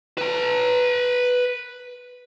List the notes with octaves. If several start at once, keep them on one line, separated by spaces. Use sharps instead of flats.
B4 A#5